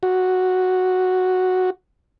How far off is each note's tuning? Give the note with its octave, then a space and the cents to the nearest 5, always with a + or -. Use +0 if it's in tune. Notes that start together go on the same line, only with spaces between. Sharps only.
F#4 -5